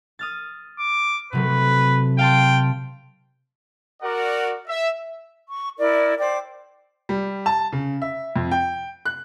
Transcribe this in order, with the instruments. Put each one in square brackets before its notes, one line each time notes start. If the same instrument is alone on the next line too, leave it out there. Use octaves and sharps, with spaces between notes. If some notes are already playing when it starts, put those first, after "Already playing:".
[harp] D#6 F6 A6
[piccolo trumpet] D6
[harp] C3 F#3 A3 [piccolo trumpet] B4
[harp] F5 A5 C6 [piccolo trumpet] G5
[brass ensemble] F#4 A#4 D5 F#5
E5
[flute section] C#6
E4 A#4 D5
C5 D5 G5 D6
[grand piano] G3
A5
C#3
E5
F2
G5
F#6